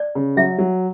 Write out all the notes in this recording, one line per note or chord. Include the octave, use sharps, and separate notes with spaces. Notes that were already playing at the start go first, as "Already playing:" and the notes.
Already playing: D5
C#3
F#3 E5
F#3